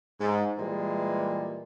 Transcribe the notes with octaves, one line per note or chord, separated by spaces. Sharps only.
G#2
A#2 E3 G3 G#3